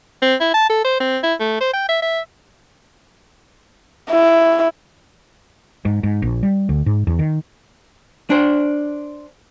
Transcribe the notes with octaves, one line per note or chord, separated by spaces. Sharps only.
C4
E4
A5
A4
C5
C4
E4
A3
C5
G5
E5
E5
E4
G#2
G#2
A#1
G3
D2
G#2
E2
D#3
D4 C5